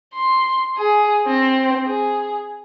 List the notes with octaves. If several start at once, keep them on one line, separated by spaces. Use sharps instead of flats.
C6
G#4
C4
G#4